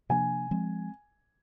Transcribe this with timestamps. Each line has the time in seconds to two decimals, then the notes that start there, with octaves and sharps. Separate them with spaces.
0.09 C3 F3 A#3 D4 G#5
0.51 F3 G#3 C4